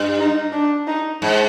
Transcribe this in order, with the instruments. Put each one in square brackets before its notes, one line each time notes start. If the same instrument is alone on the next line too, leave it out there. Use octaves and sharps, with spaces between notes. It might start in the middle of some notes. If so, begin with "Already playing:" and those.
Already playing: [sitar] G2
[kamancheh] D#4
D4
D#4
[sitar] G#2